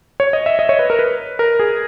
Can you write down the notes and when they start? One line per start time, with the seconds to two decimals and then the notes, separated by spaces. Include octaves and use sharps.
0.20 C#5
0.33 D#5
0.46 E5
0.59 D#5
0.69 C#5
0.79 B4
0.90 A#4
0.99 B4
1.39 A#4
1.60 G#4